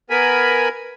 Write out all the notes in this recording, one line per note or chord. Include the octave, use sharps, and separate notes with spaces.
B3 A#4 G#5 B5